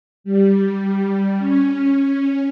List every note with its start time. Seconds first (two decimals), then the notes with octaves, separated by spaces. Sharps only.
0.24 G3
1.39 C#4